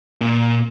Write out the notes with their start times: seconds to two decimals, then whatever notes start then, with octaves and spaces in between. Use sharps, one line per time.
0.21 A#2